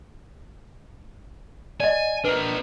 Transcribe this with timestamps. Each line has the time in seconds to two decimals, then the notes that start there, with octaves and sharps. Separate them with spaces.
1.80 D5 D#5 G#5
2.24 D4 A#4 B4